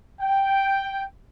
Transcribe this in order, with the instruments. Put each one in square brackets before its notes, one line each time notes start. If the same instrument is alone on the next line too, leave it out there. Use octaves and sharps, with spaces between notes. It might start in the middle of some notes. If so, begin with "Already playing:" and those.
[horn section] G5